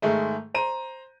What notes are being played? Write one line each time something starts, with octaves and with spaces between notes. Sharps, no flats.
G#2 D#3 G#3 A3
C5 A#5 D#7